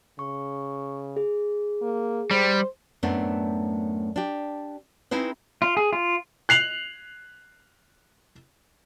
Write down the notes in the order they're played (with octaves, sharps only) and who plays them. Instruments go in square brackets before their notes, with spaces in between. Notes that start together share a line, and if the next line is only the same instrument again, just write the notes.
[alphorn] C#3 [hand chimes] C#6
[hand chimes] G#4
[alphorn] A#3
[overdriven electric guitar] G3 [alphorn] C5
[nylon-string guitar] F#2 A2 A3 B3 C4 D4
D4 G4
C4 D#4 E4 G#4 B4
[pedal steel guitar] F4
G#4
F4
[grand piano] F#6 C7 F7 F#7